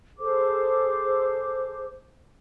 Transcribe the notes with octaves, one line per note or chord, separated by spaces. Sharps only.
G#4 A4 C5 D6